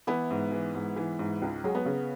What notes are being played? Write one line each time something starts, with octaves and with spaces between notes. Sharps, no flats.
E3 B3 E4
G#2
E3
G#2
E3
G#2
C#2
F#3 G#3
B3
C#3